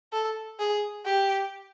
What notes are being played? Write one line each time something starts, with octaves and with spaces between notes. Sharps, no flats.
A4
G#4
G4